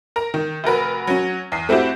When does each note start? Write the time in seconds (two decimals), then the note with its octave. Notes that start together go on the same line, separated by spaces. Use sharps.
0.16 A#4 A#5
0.34 D#3
0.64 F1 F#4 A#4 B4
1.07 F#3 C#4
1.52 E2 C7
1.69 A3 C4 E4 F#4 G4